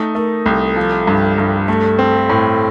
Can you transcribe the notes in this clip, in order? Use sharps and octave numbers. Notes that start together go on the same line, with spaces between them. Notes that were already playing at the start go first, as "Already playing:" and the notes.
Already playing: A3 D#4
A3 A#4
C2 A4
F3
G2
G2
A3 A4
C4
A2